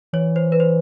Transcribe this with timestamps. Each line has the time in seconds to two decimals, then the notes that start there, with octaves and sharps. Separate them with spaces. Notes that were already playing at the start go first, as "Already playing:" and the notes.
0.13 E3 C#5
0.36 C5
0.52 B4
0.60 C5